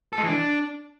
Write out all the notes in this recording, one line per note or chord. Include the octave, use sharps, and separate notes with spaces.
A4
G#3
E3
D4